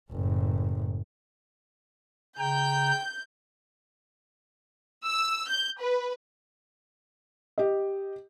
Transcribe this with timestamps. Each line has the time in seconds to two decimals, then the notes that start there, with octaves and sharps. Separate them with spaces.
0.11 F#1 A2
2.39 C#3 G5 A#5 G6
5.05 E6
5.48 G6
5.80 B4
7.58 G4 D#5